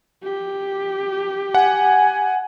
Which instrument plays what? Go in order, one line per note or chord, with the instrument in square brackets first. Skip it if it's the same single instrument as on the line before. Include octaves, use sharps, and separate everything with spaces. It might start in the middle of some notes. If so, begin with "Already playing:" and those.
[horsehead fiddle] G4
[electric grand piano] F#5 [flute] G#5